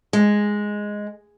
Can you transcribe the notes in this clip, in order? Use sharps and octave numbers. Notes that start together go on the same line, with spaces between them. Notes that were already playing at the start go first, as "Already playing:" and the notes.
G#3